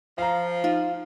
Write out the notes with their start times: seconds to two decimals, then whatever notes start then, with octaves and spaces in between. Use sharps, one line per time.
0.18 F3 F5 A#5
0.64 D#4 F4